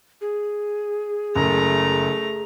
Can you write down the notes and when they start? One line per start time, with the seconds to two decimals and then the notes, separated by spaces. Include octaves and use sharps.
0.21 G#4
1.35 F#1 A3 A#5